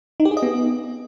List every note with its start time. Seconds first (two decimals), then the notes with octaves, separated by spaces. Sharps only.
0.20 D#4
0.25 G4
0.31 G#4
0.37 D#5
0.43 B3